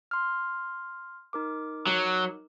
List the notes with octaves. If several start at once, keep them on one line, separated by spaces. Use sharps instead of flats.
C6 F6
D#4 A#4 D6
F#3